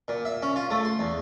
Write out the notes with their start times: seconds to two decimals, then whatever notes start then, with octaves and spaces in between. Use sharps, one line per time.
0.08 A#2
0.25 E5
0.43 C#4
0.56 F4
0.70 A3
0.85 C6
0.99 E2